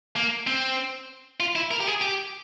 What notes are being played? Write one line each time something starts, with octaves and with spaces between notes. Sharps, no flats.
A#3
C4
F4
E4
A#4
G4
G#4
G4